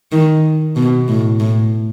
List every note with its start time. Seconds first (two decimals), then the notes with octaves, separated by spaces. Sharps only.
0.12 D#3
0.76 B2
1.08 A2
1.40 A2